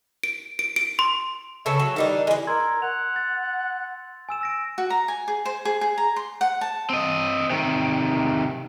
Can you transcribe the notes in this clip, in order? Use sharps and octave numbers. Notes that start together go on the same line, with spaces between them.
D7
D7
D7
C6
C#3 B3 A4 C#5 E5
F#3
D#3 E3 G3 D4 D#4 A4
E3 G#3 B4
A#4 C6 E6 G#6
F#5 F7
A6
G#5 E6 E7
E6 A#6 D7
F#4
A#5
G#5
G#4
C5
G#4
G#4
A#5
C6
F#5
A5
C4 D#5
C3 D#3